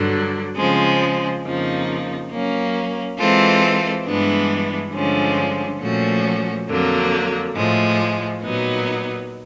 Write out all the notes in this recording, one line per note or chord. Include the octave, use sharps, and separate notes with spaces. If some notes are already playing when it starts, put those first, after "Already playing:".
Already playing: G2 D3 F#3
C#3 F3 G#3 C4
F2 C#3 F3 A#3 D#4
F#3 A#3 C#4
E3 G#3 C4 F4 A4
G2 E3 G#3 B3 D4
G2 D3 F3 G#3 C#4
A#2 F3 A3 C#4 F#4
F2 D3 F#3 A#3
A2 F3 G#3
A#2 F#3 B3 D#4